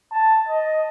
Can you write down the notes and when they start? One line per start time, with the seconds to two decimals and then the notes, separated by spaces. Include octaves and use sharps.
0.12 A5
0.49 D#5